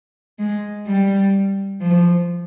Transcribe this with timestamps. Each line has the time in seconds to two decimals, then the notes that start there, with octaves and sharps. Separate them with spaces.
0.39 G#3
0.87 G3
1.81 F3